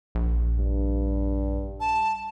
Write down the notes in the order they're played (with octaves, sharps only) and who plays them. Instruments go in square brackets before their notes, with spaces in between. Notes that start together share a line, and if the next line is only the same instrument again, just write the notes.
[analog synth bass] A#1
[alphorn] G2
[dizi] A5